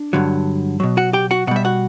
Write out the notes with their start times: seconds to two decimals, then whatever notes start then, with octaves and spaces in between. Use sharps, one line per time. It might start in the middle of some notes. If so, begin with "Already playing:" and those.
Already playing: D4
0.13 G2 D3 F#3
0.80 B2 F#3
0.97 F#4 F#5
1.13 G4 G5
1.31 F#4 F#5
1.47 B2 F#5
1.51 G3 E5
1.65 F#4 F#5